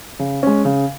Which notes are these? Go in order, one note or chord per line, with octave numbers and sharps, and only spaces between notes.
C#3
G#3 C#4
C#3